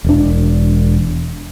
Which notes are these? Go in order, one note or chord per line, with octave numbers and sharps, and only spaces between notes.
E1 D4